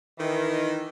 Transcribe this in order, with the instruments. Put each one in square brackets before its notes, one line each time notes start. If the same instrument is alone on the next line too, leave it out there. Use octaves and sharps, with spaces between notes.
[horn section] D#3 E3